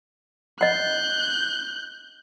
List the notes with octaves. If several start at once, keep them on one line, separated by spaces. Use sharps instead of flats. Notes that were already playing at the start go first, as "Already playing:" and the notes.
D#5 F#5 F#6 G6